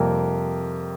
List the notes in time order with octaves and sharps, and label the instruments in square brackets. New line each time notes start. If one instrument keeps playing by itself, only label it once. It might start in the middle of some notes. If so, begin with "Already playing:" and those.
Already playing: [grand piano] F2 C3 G3 A#3